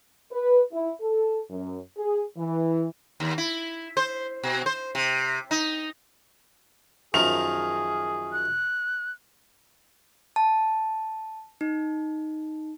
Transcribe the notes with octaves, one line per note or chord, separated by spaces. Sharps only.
B4
E4
A4
F#2
G#4
E3
D#2
E4
C5
B2
C5
C3
D#4
F#2 D#3 F3 G#4 F7
F#6
A5
D#4